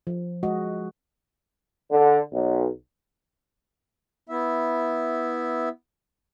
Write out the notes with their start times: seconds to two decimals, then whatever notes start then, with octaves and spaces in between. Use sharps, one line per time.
0.07 F3
0.43 G#3 F#4 D#5
1.91 D3
2.32 B1
4.29 B3 E4 E5